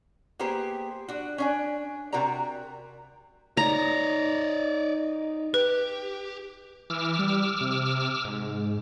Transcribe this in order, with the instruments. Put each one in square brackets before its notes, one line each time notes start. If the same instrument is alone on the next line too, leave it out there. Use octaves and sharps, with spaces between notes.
[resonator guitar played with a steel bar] A#3 B3 G4 G#4 C5
D4 F#4
C#4 D4 G#5
C3 F#4 A#4 D5 A#5
[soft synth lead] D#4 [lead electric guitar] C#5 D5 [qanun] A#5
[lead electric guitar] G4 [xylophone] B4
[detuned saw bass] E3 [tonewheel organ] D6 E6 F6
[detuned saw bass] G3
C3
G#2